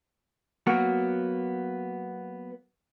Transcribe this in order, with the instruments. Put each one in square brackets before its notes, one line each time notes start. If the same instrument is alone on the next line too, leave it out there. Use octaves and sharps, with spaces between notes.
[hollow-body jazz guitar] F#3 A#3 B3 F#4